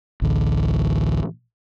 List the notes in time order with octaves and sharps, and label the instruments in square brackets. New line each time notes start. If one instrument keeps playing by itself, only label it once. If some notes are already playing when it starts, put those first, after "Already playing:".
[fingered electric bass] A1 D2